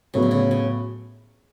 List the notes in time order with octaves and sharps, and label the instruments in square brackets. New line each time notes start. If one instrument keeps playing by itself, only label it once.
[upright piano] A2 F#3 B3 [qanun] C#3
[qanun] D3
C#3
C#3